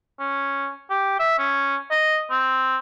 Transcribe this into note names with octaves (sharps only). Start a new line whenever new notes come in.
C#4
G4
E5
C#4
D#5
C4